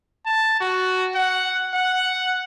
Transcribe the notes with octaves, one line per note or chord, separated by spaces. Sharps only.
A5
F#4
F#5
F#5